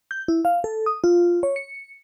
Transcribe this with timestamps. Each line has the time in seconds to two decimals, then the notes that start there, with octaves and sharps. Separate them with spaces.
0.11 G6
0.28 E4
0.45 F5
0.64 A4
0.86 D#6
1.04 F4
1.43 C#5
1.56 C#7